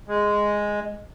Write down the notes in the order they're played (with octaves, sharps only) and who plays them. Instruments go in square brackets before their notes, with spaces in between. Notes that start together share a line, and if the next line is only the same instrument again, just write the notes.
[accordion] G#3